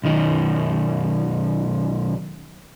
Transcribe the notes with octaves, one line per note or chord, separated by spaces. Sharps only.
B1 D#3